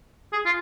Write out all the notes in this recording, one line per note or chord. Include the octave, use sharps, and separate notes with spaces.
G#4
F4